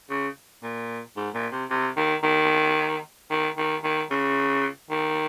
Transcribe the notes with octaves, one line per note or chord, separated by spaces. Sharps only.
C#3
A#2
G#2
A#2
C3
C3
D#3
D#3
D#3
D#3
D#3
C#3
D#3